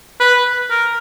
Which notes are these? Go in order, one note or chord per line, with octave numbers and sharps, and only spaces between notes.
B4
A#4